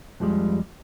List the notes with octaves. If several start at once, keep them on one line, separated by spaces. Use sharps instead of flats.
F2 F3 G3 G#3